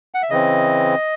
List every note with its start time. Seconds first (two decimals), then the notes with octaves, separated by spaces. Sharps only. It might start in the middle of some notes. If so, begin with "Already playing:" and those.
0.14 F#5
0.22 E5
0.30 C#3 E3 C4 D#5